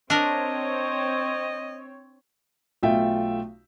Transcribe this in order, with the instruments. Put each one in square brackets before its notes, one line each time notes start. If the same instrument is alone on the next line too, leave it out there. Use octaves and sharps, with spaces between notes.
[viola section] C4 C#5 [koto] D4 A#4 [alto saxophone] D#5
[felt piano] B1 A3 F4 E5 G5